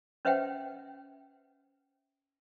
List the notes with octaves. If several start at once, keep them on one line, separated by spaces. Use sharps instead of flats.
C#4 B4 C5 E5 F#5 G5